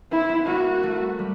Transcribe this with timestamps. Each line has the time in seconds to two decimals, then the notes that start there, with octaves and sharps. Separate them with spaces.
0.12 C4 E4
0.29 B3
0.47 A#3 F#4
0.83 A3
1.19 G3